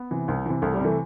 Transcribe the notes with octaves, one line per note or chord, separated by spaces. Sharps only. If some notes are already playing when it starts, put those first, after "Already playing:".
Already playing: B3
C3 E3
C2
C3 E3
C2 A3
G3
C3 E3 A3